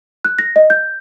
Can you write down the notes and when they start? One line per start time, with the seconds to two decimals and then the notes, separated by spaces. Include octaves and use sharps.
0.25 F#6
0.39 A#6
0.56 D#5
0.70 G6